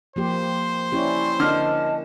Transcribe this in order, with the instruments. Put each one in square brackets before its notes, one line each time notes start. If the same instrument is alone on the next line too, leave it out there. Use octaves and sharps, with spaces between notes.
[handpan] F3 A#3 G4 [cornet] C5
[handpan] C#4 E4 G4 [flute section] D5 C#6
[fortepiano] D3 F6 [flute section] A#4 D#5 A5